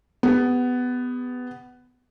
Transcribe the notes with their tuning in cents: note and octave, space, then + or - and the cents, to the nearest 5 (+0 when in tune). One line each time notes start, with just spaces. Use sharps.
B3 +15 G4 +45